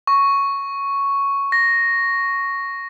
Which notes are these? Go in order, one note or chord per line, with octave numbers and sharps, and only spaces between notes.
C#6
A#6